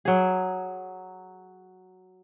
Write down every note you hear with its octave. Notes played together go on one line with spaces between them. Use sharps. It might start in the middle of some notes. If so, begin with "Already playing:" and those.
F#3 G#4